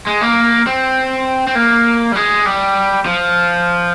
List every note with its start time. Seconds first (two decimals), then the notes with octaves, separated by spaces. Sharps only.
0.07 G#3
0.21 A#3
0.67 C4
1.47 C4
1.55 A#3
2.12 G3
2.16 G#3
2.45 G3
3.06 F3